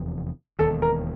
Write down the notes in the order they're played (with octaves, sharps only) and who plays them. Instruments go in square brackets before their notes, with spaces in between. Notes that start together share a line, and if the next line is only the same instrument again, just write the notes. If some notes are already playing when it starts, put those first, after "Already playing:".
Already playing: [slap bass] F1 E2 C3 F3
[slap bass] E1 D#2 D#3 [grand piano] A4
[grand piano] A#4